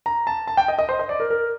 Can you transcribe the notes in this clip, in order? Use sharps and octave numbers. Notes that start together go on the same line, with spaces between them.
A#5
A5
A5
G5
D#5
D#5
C5
D#5
D5
A#4
A#4